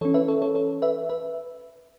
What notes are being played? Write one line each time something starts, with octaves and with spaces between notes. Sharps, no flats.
E3 C#4 A4 C#5
B4 E5
A4 C#5
A4 C#5
A4 C#5
B4 E5
B4 E5